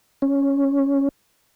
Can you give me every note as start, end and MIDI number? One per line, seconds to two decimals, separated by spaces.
0.22 1.09 61